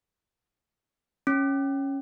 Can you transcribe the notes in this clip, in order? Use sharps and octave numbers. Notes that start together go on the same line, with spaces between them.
C#4